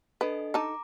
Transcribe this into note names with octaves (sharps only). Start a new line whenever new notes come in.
D4 A4 B4 D#5
D#4 A4 A#5 D6